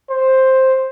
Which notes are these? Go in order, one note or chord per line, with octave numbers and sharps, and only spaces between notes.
C5